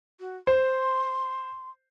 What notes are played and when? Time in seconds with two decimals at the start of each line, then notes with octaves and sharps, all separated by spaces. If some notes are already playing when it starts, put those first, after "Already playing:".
0.20 F#4
0.47 C5 C6